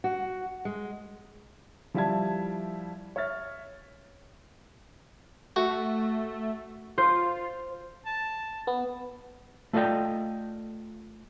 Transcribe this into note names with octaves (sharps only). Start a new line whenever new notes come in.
F#4
G#3
F3 G3 E4 E5 A5 G#6
C#5 E5 F6 A6
A3 F#4
F4 C5
A5
B3
A3 F4 A4 D5 D#5 G5